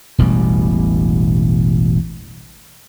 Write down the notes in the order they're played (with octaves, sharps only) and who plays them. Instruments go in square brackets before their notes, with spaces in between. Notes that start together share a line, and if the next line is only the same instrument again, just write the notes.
[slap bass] E1 A1 B2 G3